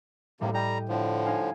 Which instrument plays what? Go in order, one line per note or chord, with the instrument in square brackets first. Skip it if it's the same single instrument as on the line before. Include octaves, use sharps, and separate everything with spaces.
[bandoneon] D#2 C3 A#3 [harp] A2 G3
[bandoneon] G3 A#5 [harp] D#5 G5
[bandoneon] A2 D3 F3
[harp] D#4 F5 G#5